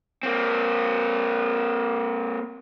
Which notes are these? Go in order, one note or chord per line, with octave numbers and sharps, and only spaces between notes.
A#3 C4